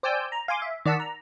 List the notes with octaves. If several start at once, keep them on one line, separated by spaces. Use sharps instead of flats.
C5 D5 G5 G#5 E6 G6
A#5
F5 G#5 C6 D6
E5
D#3 D5 F#5 A5 E6 B6
A#5